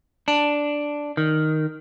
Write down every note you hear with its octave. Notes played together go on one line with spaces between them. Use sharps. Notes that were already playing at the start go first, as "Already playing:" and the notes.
D4
D#3